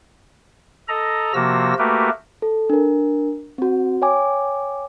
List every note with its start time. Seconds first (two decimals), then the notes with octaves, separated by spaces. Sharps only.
0.88 A4 D#5 A#5
1.34 C3 F3 A#3 F#4 E6 A#6
1.78 A3 A#3 F#4 G4 A#4 B4
2.42 A4
2.70 D4 A#4
3.58 C4 F#4
4.02 C#5 G5 G#5 D6